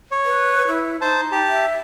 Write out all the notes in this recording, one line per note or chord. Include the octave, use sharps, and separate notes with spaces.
C#5
B4
E4
D#4 C5 A5
G4 A5
E5